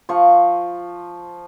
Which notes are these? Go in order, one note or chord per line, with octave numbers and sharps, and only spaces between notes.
F3 C#6